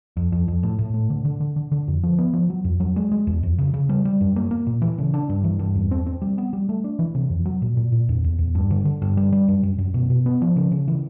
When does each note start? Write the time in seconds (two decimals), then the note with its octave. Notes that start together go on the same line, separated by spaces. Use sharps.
0.17 F2
0.32 F2
0.48 F2
0.63 A2
0.79 A2
0.94 A3
1.10 D3
1.25 D3
1.40 D3
1.56 D3
1.72 D3
1.88 F2
2.03 F3
2.18 B3
2.33 F3
2.50 F#3
2.65 F2
2.80 F#3
2.96 G#3
3.12 G#3
3.27 E2
3.43 F2
3.58 C#3
3.74 C#3
3.89 G3
4.05 G3
4.21 F#2
4.36 A#3
4.51 A#3
4.67 A#2
4.82 E3
4.98 C#3
5.14 D4
5.29 G2
5.44 E3
5.59 G2
5.75 E2
5.91 C4
6.07 C4
6.22 G3
6.38 B3
6.53 G3
6.69 A3
6.84 D4
6.99 E3
7.15 C3
7.30 F2
7.46 F#3
7.62 A#2
7.77 A#2
7.92 A#2
8.09 E2
8.24 E2
8.39 E2
8.55 G2
8.71 D3
8.85 D3
9.02 G2
9.17 G3
9.32 G3
9.48 F#2
9.63 F#2
9.79 F#2
9.94 B2
10.10 B2
10.26 B3
10.42 F3
10.56 C#3
10.71 C#3
10.88 E3